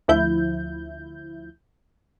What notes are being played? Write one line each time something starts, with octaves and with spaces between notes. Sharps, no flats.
D2 F3 E4 G6